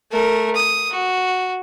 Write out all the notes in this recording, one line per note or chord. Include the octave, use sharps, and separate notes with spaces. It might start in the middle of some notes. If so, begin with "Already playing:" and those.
A3 A#4
D#6
F#4